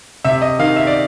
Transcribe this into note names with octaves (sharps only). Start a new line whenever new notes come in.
C3 E5
D#5
D#3 F5
E5
D5